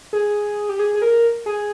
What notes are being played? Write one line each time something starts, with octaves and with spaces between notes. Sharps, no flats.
G#4
G4
G#4
G#4
A#4
G#4